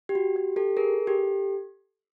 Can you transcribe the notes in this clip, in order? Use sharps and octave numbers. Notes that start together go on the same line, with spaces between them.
G4
F#4
G4
G4 A4
G#4 A#4
G4 A4